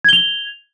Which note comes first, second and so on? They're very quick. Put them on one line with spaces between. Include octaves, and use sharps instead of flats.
G#6 G7 F7